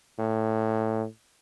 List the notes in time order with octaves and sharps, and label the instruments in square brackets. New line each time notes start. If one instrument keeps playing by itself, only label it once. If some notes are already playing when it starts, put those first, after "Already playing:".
[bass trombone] A2